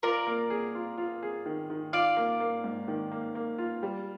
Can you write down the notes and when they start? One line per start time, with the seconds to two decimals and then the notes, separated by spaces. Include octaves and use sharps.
0.03 F4 A#4 D5
0.27 A#3
0.50 G#4
0.75 F4
0.98 F4
1.23 G#4
1.46 D#3
1.70 D#3
1.93 F4 D5 F5
2.17 A#3
2.40 A#3
2.64 G#2
2.88 D#3
3.12 A#3
3.35 A#3
3.58 F4
3.83 G3